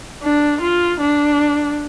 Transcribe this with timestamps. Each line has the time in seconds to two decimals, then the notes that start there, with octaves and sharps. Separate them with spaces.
0.23 D4
0.61 F4
1.00 D4